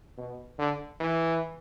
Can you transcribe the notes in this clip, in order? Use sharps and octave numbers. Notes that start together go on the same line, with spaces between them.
B2
D3
E3